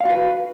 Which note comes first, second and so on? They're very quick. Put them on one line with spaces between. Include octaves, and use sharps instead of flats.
F5 F#4 B4